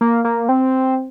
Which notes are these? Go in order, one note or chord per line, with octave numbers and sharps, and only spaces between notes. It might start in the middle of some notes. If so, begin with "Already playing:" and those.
A#3
A#3
C4